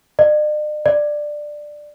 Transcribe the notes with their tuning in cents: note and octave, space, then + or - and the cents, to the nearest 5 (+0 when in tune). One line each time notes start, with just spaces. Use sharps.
D5 +45
D5 +10